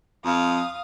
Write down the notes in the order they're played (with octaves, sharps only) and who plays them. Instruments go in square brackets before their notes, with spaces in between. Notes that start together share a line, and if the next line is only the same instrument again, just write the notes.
[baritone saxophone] F2 [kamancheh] F5 D#6